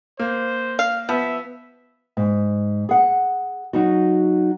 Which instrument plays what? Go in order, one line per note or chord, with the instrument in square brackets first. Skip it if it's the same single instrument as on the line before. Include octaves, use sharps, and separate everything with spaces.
[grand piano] A#3 [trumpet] C5
[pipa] F5
[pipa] F3 [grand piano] B3 [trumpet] E5
[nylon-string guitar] G#2
G#4 F#5
F#3 D#4 F#4